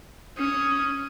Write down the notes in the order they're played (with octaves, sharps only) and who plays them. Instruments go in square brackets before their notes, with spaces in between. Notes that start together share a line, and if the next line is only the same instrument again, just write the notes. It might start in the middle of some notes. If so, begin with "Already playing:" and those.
[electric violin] C#4 D#6